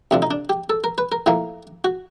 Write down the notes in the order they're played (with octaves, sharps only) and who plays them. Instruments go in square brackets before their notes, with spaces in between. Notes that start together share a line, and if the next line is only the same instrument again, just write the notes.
[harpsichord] D2 C3 F3 D4
D#4
D4
G4
A4
A#4
B4
A#4
A2 F3 A#3
F#4